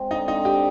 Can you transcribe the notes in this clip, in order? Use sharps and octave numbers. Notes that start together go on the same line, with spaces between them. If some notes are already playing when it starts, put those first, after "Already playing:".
Already playing: G#3 C4
D3 D#4
C4 D#4
D3 G4